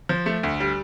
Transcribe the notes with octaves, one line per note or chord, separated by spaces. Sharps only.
F3
A3
D2
G3